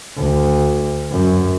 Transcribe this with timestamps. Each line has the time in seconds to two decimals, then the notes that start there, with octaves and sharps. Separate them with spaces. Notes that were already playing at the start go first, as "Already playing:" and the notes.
0.17 D2
1.11 F#2